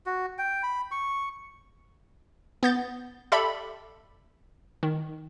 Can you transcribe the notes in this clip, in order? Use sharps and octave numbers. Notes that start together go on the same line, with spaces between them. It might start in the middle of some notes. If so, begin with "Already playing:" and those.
F#4
G5
B5
C#6
B3 G6 A6
G4 A4 D5 E5 B5
D#3